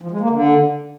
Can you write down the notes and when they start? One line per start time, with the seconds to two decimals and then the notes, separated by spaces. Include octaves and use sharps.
0.02 F3
0.11 G#3
0.21 A#3
0.30 D3